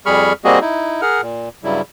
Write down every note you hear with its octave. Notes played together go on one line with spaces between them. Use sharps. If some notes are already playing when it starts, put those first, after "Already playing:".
F2 G3 G#4 B5 C#6 F6
G3 A#3 C4 F#4 G#4 D#5
D#4 E4
G#4 A#4 F#5 F6
A#2
G2 C#3 F#3 G3 E4